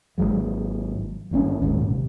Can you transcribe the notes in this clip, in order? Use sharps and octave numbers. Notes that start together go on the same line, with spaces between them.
G#1 D#2 F#3 G#3
G#1 G2 C4 C#4
D#1 G#1 G#2 C#4
C3